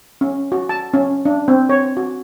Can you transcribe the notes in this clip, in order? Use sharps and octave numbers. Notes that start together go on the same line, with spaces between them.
C#4
F#4
A5
C#4
D4
C4
C#5
F#4